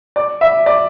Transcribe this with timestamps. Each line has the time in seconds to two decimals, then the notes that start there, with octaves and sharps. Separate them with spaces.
0.16 D5
0.41 E5
0.66 D5